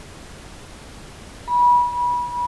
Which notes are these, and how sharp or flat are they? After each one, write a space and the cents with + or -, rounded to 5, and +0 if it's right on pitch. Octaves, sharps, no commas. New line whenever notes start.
B5 -25